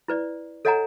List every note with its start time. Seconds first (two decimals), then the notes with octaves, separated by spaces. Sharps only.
0.08 E4 B4 D5
0.65 A4 C#5 D#5 F#5 G#5 A#5